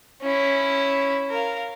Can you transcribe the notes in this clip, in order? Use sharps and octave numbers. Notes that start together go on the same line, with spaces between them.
C#4 E4
A#4 F5